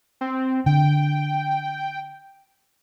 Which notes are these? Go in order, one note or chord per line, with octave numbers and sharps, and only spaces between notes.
C4
D3 G5